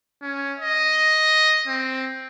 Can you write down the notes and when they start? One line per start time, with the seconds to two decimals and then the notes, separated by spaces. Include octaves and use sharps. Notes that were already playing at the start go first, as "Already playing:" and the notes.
0.22 C#4
0.59 D#5
1.67 C4